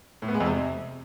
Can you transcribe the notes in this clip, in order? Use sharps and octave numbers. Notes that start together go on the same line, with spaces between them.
A2
B3
G#3
F2
C3